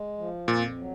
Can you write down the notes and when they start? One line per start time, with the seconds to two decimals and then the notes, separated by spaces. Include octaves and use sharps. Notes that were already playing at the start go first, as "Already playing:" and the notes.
Already playing: G#3
0.18 F3
0.48 F2 A#2
0.78 F#3